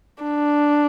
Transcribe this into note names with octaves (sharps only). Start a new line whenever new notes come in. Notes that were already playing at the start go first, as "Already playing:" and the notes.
D4